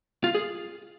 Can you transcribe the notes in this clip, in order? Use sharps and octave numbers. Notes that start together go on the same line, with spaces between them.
F4
G#4